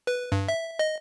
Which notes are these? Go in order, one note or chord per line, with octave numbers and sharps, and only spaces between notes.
B4
G2
E5
D#5